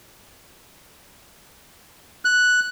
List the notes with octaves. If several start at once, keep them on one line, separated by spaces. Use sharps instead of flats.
F#6